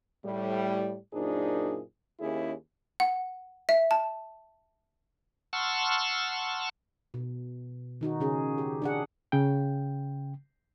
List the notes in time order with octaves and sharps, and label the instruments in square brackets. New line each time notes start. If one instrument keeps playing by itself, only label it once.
[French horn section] A2 G3
F#2 A#2 D4 D#4 G#4 C5
D#2 C#4 E4 G#4
[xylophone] F#5
E5
A5
[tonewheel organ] F#5 A5 C6 C#6 E6 F6
[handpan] B2
D#3 D#4 F#4
C#3 C#4 G#4
G4
D4 G#4 F#5
[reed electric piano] C#3 G5